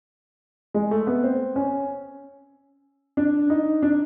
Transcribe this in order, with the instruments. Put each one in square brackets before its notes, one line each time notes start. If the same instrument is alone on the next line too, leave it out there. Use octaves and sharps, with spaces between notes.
[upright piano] G#3
A3
B3
C4
C#4
D4
D#4
D4